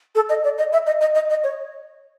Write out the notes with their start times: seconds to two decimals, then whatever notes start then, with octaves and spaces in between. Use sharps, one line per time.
0.15 A4
0.29 D#5
0.44 D5
0.58 D#5
0.73 E5
0.87 D#5
1.01 D#5
1.15 D#5
1.30 D#5
1.44 C#5